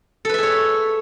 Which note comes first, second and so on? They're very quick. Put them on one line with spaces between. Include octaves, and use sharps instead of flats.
A4 B4 E5 G#4 C#5